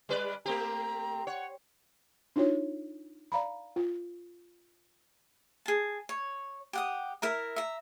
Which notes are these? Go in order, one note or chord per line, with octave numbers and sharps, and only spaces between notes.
G3 B4 D5
A3 C4 G4 A#5
C#5 F#5
D4 D#4 F4 F#4 C#5
D5 F5 A#5 B5
F4
G#4 A5
C#5
G4 F#5 D#6
E4 A#4 E5 A#5
E5 A#5